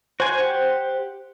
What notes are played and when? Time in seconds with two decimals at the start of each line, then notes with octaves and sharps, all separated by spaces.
0.20 F#4 C5 G#5
0.40 G4 F#5